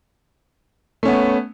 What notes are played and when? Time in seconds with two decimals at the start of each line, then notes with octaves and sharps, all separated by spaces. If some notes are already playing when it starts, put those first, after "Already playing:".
1.03 A3
1.05 C#4
1.08 B3